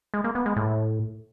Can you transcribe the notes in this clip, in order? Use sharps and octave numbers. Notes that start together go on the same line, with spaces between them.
G#3
A#3
B3
G#3
A2